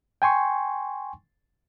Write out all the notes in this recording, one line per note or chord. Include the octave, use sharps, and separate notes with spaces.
G5 G#5 C6 C#6